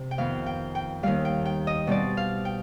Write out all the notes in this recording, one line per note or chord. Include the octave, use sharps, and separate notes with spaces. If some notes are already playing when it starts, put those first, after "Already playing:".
Already playing: C3
G5
F2 D#3 B3 F5
G5
G5
D#2 D#3 G3 F5
G5
G5
D#5
B2 G3 C4 D5
F5
G5